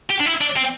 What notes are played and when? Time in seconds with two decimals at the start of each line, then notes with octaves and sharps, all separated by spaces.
0.10 G4
0.20 D4
0.26 E4
0.41 D4
0.57 C4